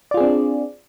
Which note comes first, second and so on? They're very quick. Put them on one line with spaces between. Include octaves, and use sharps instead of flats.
D5 F4 G#4 C4 D4